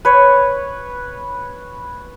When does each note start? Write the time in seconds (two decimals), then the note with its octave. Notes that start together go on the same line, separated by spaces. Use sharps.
0.05 B4 C#5